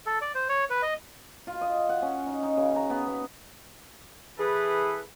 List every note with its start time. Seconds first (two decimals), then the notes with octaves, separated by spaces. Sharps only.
0.06 A4
0.21 D5
0.35 C5
0.49 C#5
0.70 B4
0.82 D#5
1.47 F4
1.61 D#5
1.89 F#5
2.02 C#4
2.27 D#4
2.43 D#4
2.57 C#3
2.76 A#5
2.90 B3
3.07 B3
4.39 E3 G#4 A4 B4